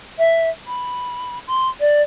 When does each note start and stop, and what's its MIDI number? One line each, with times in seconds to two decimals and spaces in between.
0.18 0.49 76
0.66 1.38 83
1.47 1.68 84
1.79 2.02 74